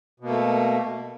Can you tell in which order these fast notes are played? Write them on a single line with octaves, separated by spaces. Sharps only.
B2 A#3 A3